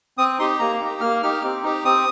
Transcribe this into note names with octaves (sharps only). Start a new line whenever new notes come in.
C4 D#6
D#4 G4 C6
A#3 A#5
D#4 G4
A#3 F6
D#4 G4 F6
C4
D#4 G4
C4 D#6